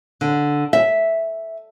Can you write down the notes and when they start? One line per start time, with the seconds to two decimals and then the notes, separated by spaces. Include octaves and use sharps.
0.21 D3
0.73 E5